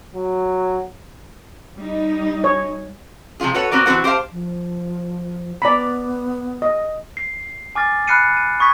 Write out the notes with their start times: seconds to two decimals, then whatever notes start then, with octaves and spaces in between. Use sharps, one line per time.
0.15 F#3
1.77 G3 D#4
2.44 C#5
3.40 C3 F3 G3 F4 G#4
3.54 F#4 A4 B4 C#5 F#5
3.71 B3 C4 F#4 A#4 D5
3.86 E3 G3 C4 F#4 F#5
4.04 G4 C5 E5 F5 A5
4.32 F3
5.62 B3 D5 A#5 B5
6.62 D#5
7.17 C7
7.75 G#5 D6 F6 A6
8.07 B5 F6 F#6 C7 C#7 D#7
8.37 D#7
8.60 B5 C#6 D#6 G#6 B6